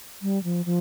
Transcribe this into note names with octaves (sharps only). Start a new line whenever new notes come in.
G3
F3
F3